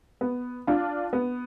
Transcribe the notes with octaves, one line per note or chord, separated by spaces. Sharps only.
B3
D4 F4
B3